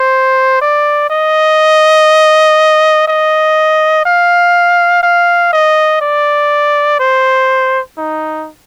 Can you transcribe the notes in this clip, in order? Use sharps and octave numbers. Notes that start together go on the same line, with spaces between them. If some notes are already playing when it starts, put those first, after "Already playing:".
Already playing: C5
D5
D#5
D#5
F5
F5
D#5
D5
C5
D#4